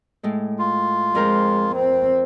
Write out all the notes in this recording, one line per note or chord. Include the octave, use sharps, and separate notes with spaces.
A2 G#3
F4
F2 G#3 A#4 C5
C4